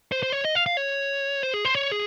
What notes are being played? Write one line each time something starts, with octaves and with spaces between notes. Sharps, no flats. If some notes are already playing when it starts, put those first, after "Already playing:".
C5
C5
C#5
D#5
F5
F5
C#5
C5
G#4
C5
C#5
G#4